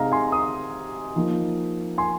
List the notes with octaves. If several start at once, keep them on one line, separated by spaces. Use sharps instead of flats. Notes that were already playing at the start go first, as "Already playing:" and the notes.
Already playing: C3 G#3 D#4 D#5 F5 A#5
G#5 C6
A#5 D#6
F3 A#3 D#4
G#5 C6